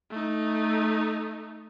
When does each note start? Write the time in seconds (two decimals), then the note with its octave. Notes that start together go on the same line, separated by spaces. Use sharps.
0.10 A3 D#4